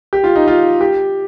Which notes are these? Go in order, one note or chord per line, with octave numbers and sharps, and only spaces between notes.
G4
F4
D#4
F4
G4